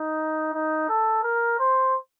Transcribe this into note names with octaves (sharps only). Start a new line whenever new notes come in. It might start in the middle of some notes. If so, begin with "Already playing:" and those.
Already playing: D#4
D#4
A4
A#4
C5